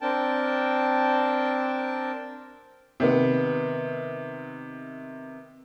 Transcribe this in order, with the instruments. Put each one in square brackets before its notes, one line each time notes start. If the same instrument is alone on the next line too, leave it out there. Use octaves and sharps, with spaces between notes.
[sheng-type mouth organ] C4 D4 A#4 G5 A5
[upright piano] C3 D#3 B3